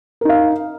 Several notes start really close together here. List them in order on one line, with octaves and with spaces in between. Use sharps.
A#4 D#4 F5